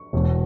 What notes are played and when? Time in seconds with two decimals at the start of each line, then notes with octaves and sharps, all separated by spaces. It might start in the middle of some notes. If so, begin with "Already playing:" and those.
Already playing: C#6
0.13 E1 E2 B2